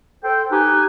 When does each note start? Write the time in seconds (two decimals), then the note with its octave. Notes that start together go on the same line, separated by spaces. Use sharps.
0.23 A4 C5 G5
0.51 D#4 G4 B4 G#5